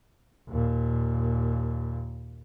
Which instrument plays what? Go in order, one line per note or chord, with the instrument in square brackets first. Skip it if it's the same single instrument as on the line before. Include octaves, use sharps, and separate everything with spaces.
[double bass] D#2 A#2